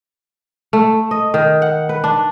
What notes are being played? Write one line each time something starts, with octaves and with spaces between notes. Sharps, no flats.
A3
D#5
D#3
F#5
B4
D4